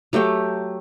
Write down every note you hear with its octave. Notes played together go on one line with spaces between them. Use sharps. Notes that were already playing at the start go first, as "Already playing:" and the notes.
F#3 A3 G4 G5